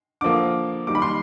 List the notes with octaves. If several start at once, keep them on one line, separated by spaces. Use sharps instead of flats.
D3 F3 A#3 D6
D#3 G3 A#3 D6
B5
C6